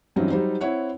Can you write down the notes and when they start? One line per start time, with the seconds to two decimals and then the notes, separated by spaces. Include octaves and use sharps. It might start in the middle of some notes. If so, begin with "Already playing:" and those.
0.16 G2 E3 F#3 C4 C#4 D#4
0.30 F#3 G3 D#4 C5
0.61 C4 E4 C#5 F#5